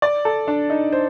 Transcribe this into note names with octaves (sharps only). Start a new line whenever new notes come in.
D5
A4
D4
D#4
C5